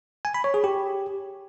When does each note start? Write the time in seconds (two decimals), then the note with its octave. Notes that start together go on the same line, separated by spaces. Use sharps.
0.25 G#5
0.34 B5
0.44 C#5
0.54 G#4
0.64 G4